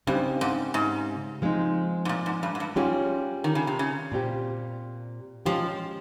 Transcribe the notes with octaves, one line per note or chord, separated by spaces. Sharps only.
G2 C#3 G3 C4 D#4 G4
G#2
G#2
F3 G#3 C4 D#4
G#2
A#2
G#2
G2
G#2
G2
G#2 G3 C#4 F4 G#4
D#3
C#3
C3
C#3
A#2 G3 C4 G4
F3 G#3 C#4 G4